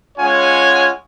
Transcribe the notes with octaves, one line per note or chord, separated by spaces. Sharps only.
G#3 C#4 F4 C#5 F#5 G#5